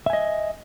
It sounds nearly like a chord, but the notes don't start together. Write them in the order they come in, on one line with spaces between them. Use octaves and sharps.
E5 G#5 D#5